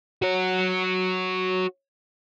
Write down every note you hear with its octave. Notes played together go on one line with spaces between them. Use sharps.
F#4 C#5